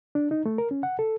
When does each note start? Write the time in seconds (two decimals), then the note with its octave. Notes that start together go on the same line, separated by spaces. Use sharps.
0.15 D4
0.31 D#4
0.46 A3
0.58 A#4
0.71 C#4
0.83 F#5
0.99 A4